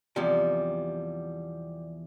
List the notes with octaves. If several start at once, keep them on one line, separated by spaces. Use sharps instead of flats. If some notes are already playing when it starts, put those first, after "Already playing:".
E2 C3 F3 G3